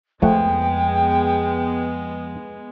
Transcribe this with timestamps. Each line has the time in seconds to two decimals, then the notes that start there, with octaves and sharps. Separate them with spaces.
0.22 F2 F3 G#3 A3 B3 F#5 G5